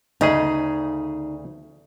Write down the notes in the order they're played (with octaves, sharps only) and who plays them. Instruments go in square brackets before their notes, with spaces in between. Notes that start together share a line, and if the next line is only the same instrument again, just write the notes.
[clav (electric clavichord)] D2 C#3 G#4 [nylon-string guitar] D#4